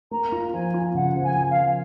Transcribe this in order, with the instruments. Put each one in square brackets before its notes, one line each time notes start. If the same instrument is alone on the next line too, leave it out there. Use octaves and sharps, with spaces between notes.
[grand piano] A#3 [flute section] A#5
[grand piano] F4
[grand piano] F3 [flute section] G#5
[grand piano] F4
[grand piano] C#3 [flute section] F#5
[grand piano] F3
[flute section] G#5
[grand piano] F3
[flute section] F5
[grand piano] F3